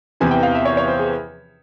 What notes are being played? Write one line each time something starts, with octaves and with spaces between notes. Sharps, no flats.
E2 C3 E3 G#5
G5
F5
E5
C#5
C#5
C5
G#4